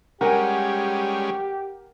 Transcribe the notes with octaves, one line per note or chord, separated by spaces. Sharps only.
G3 G#3 C#4 G4 A#4 F#5 G#5